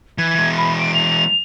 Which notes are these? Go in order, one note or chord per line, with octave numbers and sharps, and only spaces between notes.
E3 G#6
E3 G#3
B5
D7
F7